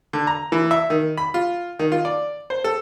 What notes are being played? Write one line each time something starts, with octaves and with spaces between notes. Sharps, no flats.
D3
A#5
E3
E5
D#3
B5
F4
D#3
F4
D5
C5
A4